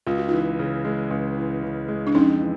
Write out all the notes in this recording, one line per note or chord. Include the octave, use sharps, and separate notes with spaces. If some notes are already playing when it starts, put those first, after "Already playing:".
C#2 F4
F#4
E3 D#4 F4
C#3
G#3
C#2
E3
C#3
G#3
D4
F2 C#4 D#4
E3